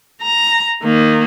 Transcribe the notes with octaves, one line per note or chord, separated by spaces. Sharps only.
A#5
D#3 A#3